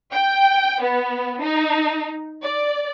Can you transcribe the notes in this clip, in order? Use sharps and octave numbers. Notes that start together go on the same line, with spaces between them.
G5
B3
D#4
D5